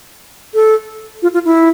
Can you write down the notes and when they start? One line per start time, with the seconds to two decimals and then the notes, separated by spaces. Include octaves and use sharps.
0.54 A4
1.22 F4
1.34 F4
1.45 E4